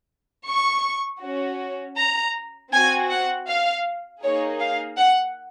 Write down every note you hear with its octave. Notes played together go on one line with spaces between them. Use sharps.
C#6
C#4 F#4
A#5
C4 F#4 G#5
F#5
F5
A#3 D#4 G#4 C#5
F5
F#5